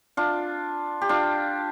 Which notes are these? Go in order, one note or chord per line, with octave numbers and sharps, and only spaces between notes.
D4 F4
G4
D4 F4